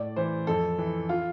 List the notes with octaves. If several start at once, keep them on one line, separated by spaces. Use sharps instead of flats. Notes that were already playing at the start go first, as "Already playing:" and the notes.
Already playing: A2 D5
E3 C5
F2 A4
E3
F4